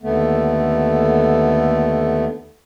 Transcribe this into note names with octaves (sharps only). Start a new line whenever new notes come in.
D#2 D3 A3 B3